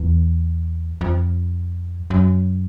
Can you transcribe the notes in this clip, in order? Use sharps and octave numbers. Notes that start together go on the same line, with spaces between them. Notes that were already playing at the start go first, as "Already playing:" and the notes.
Already playing: E2
F2
F#2